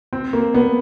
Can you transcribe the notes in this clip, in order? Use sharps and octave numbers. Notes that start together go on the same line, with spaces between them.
C4
A#3
B3